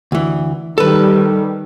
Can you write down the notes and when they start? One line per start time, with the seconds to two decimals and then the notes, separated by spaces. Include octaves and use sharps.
0.12 D2 E3
0.78 D#3 G3 A4 B4